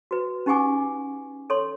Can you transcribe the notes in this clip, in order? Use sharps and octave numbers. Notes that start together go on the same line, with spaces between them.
F#4 B4
C#4 D#4 G4 F#5 G#5 D6
A4 C#5 C6